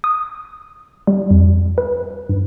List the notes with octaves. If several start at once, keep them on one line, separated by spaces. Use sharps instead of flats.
D#6
G3
F2
B4
G2